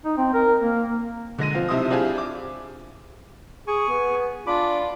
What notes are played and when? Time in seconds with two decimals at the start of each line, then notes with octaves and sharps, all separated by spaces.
0.05 D#4
0.17 C4
0.33 A#4
0.61 A#3
1.38 D3 G#3 A#6 D#7
1.55 F3 C4 F4
1.69 B1 C3 E4 C5 D#6
1.90 C4 D4 E4 F4 G4 G#4
2.18 D6
3.67 G#4 G#5 C#6
3.89 B3
4.47 D4 F4 B5 D6